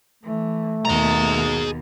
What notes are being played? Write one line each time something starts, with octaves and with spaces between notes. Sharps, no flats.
E3 A3
D#2 B2 G#4 A#5